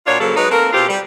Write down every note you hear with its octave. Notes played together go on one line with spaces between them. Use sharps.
A#2 D4 F4 F#4 C#5
C#3 F3 F#3 A#3 A4
F#3 G#3 D#4 B4
A3 A#3 C4 A#4
B2 C4 F4 G4
G3